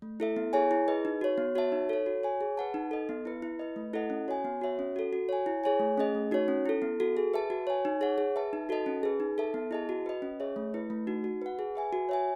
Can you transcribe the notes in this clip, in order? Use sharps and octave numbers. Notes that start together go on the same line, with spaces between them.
A3
E4 A4 E5
B3
E4 G#4 C#5 G#5
E4
G#4 B4 D#5
D#4
F#4 C#5
B3
F#4 C#5 E5 A5
D#4
A4 C#5
F#4
C#5 G#5
G#4
B4 F#5 A5
D#4
A4 D#5
B3
E4 B4
E4
B4 D#5
A3
E4 A4 D#5 F#5
C#4
F#4 C#5 G#5
B3
F#4 C#5 E5
C#4
F#4 A4
F#4
C#5 G#5
E4
G#4 C#5 G#5
A3
C#4 G#4 D#5
A3
D#4 F#4 C#5
C#4
E4 A4
B3
F#4 A4
G#4
B4 E5 A5
F#4
C#5 G#5
D#4
G#4 C#5 F#5
G#4
B4 E5 A5
D#4
F#4 A4 D#5 A5
C#4
G#4 B4
D#4
A4 E5 A5
B3
E4 G#4 D#5 A5
F#4
B4 D#5
C#4
G#4 C#5 E5
A3
E4 B4
A3
D#4 F#4
F#4
B4 F#5
G#4
B4 E5 G#5
F#4
C#5 E5 G#5